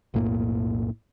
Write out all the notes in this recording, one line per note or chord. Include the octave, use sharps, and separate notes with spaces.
B1 F2 A2 A#3